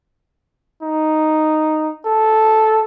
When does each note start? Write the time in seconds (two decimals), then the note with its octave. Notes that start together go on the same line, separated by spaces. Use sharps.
0.82 D#4
2.05 A4